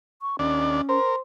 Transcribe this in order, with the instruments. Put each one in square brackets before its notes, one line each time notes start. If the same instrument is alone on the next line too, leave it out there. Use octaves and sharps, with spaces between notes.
[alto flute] C#6
[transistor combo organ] D#2 D4 D5 [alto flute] C#4
[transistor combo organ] A#4 [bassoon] C5